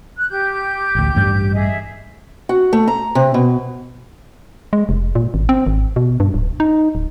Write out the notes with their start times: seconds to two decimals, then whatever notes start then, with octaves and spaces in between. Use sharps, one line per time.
0.17 F#6
0.30 G4 D6 G6
0.95 A1 D2
1.15 A1 G2 G3
1.54 G#4 D#5 E5
2.49 F#4
2.73 A3
2.88 A#5
3.15 C3
3.34 B2
4.73 G#3
4.89 F1
5.15 A#2
5.34 G#1
5.49 C4
5.67 G#1
5.96 B2
6.20 G2
6.34 D1
6.60 D#4
6.95 D1